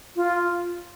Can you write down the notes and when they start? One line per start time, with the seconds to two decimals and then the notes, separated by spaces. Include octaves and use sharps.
0.16 F4